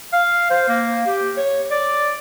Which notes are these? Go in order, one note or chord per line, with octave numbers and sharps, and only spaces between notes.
F5
C5
A#3
G4
C#5
D5